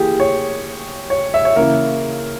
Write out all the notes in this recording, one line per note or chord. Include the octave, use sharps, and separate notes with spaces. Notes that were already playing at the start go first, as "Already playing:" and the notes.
Already playing: E3 A#3 G4 G#4
C#5
C#5
E5
C#5
C#3 E3 A#3 A#4